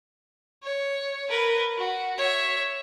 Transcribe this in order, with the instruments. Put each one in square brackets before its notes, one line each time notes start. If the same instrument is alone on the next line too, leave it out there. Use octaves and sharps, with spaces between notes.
[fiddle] C#5
A#4 B4
F#4
C#5 E5